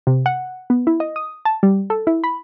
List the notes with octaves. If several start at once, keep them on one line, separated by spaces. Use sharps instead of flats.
C3
F#5
B3
E4
D#5
D#6
A5
G3
A4
E4
B5